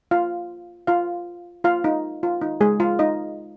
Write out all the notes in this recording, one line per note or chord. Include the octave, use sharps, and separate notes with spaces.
F4 F5
F4 F5
F4 F5
D#4
F4
D#4
G#3 G#4
F4 F5
D#4 D#5